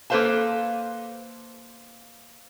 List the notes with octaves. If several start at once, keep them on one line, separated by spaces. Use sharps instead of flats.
A#3 A4 B4 C5 F5 A5